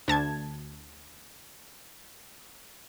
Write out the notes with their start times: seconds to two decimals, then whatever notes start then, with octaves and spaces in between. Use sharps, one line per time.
0.08 D2 A5 G#6